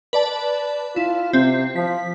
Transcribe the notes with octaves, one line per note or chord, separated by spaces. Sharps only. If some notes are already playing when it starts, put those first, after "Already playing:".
B4 D5 A5
E4 F4
C3 C4
F3 B6